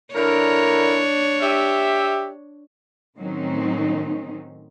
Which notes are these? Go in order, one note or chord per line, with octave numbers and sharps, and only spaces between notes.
D3 D4 E4 A#4 C#5
G4 E5
A2 D#3 F#3 C4 C#4 D#4